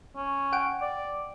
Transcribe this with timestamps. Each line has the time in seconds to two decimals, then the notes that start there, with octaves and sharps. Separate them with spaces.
0.16 C#4
0.53 F#5 G5 D7
0.81 D5